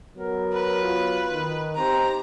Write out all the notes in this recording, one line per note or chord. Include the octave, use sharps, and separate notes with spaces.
F#3 B3 A#4
B4
F4
D#3
C4 D#4 G4 C5 A#5